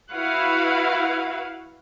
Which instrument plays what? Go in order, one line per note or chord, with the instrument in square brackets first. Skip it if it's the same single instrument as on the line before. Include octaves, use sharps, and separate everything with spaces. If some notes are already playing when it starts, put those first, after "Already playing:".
[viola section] E4 F#4 B4 F5 F#5